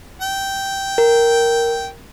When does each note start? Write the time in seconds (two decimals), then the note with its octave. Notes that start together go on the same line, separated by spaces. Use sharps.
0.21 G5
0.98 A#4